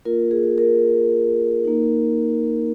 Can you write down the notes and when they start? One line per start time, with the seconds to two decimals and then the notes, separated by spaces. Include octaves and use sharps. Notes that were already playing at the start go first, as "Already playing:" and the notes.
0.05 A#3 F4 A#4
0.31 G#4
0.58 A#4
1.65 A#3 D#4